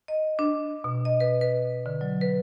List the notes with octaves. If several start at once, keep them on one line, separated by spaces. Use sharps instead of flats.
D#5
D4
B2
D#5
B4
B4
D3
F#3
B4